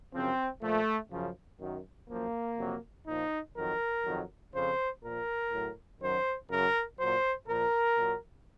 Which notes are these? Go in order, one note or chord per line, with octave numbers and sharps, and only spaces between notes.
F#2 C#3 F3 C4
A#2 F3 A3
F#2 C#3 F3
F#2 D#3 F#3
F#2 F3 A#3
F2 C3 F#3
A#2 F3 D#4
F2 D#3 F#3 A#4
F2 D#3 F#3
F2 C#3 F3 C5
A#2 F3 A#4
A2 F#3
F#2 D#3 F#3 C5
F#2 C#3 F#3 A#4
A#2 F#3 C5
A#2 F3 A#4
A#2 F#3